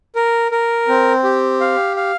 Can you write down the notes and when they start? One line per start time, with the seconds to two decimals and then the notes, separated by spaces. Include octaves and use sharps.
0.16 A#4
0.52 A#4
0.88 C4
1.24 G4
1.60 F5
1.97 F5